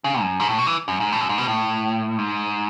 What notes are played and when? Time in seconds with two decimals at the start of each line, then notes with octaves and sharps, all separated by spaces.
0.04 C#3
0.21 F#2
0.40 G#2
0.49 A2
0.58 B2
0.67 E3
0.88 F#2
1.00 G#2
1.12 A2
1.21 F#2
1.29 G#2
1.38 B2
1.48 A2
2.18 G#2